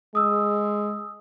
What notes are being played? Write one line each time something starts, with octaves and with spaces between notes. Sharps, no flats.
G#3 D#6 E6